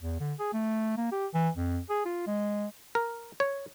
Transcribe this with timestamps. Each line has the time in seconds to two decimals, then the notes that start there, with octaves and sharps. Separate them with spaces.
0.02 E2
0.20 D3
0.39 G#4
0.53 A3
0.97 A#3
1.12 G4
1.34 E3
1.56 F2
1.90 G#4
2.05 F4
2.27 G#3
2.95 A#4
3.40 C#5